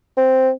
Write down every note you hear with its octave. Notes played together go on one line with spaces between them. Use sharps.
C4